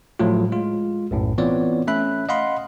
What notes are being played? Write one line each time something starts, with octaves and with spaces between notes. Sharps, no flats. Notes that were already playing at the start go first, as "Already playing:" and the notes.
A2 F3 F#3 A3 F4
G#3 F4
B1 F#2 A2
E3 B3 C4 F4 C#5 D5
A3 C#4 E5 B5 F#6
D#5 F5 F#5 B5 C6